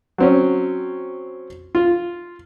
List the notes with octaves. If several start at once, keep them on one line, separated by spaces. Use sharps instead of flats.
F#3 C4 C#4
F4